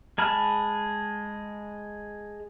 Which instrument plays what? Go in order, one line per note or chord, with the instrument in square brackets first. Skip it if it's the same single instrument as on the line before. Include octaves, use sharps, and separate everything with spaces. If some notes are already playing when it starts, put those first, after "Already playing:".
[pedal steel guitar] G#3 G#4 A5 B5 F6